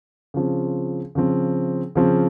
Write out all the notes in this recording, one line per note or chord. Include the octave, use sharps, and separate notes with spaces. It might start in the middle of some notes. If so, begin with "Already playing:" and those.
C#3 F3 C4
C#3 F3 C4
C#3 F3 C4